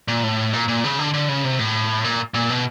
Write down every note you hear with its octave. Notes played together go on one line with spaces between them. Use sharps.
A#2
A2
A#2
A#2
C#3
D3
D3
C#3
C3
A2
A#2
A#2
B2